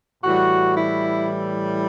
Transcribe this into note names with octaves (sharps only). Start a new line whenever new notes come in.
A2 E3 G3 F#4
E4